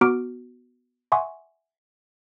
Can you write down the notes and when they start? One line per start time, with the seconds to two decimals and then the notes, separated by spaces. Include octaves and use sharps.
0.01 B3 F#4 A#5 D6 F6 D7
1.12 E5 F#5 G#5 C6 C#6 D#6